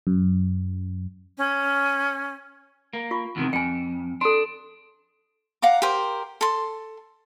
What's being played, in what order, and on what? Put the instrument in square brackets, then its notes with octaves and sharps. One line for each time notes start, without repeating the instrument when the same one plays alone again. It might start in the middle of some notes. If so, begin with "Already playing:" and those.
[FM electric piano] F#2
[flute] C#4
[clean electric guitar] A#3
[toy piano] F4 C#6
[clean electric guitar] E2 C3 D#3
[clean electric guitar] F2 [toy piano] G5 G#5
[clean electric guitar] D4 [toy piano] A4 C6
[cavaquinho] F5 F#5 A#5 D6
G4 A#4 C5
A4 C6